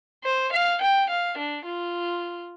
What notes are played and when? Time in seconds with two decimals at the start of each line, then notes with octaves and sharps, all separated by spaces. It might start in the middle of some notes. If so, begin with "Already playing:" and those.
0.24 C5
0.52 F5
0.81 G5
1.09 F5
1.38 D4
1.65 F4